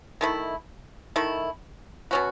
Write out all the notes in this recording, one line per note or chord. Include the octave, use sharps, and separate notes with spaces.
D#3 A3 E4
D#3 A3 E4
B2 F#3 C#4 F#4